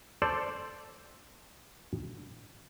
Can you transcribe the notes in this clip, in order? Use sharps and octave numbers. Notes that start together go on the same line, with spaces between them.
A4 C5 D5